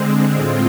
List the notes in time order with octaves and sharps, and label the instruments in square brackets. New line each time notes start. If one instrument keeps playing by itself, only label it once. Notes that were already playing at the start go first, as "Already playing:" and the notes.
Already playing: [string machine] D3 G#3 C4
A2 G#3 C4 F4